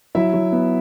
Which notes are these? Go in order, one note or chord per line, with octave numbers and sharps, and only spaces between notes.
F#3 E4 E5
F#3
B3